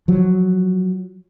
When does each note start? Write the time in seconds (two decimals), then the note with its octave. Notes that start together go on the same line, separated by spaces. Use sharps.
0.08 F3 F#3